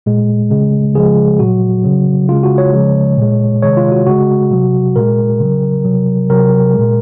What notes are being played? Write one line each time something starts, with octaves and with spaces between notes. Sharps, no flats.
A#2 G#3
C#3 G#3
C#3 F3 G#3 G#4
A#2 F#3 F#4
C#3 F#3
C#3 G#3 F4
F#4
C#5
C#3 F3 G#3
A#2 G#3
C3 D#3 G#3 C#5
F4
F#4
C#3 G#3 F#4
C3 F#3
A#2 G#3 A#4
C#3 F#3
C3 F#3
C3 F#3 A#4
A#2 G#3